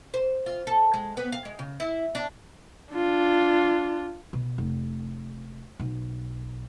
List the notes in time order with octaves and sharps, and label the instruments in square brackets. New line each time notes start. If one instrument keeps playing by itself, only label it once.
[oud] C5
F4
A4
G#3
B3
F5
G#3
C#3
E4
D4
[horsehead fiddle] D4 F4
[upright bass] B2
F1
B1